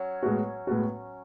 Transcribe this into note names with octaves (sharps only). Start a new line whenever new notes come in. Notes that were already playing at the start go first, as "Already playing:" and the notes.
Already playing: F#3 C#4
A2 G#3 B3 F#4
A2 G#3 B3 F#4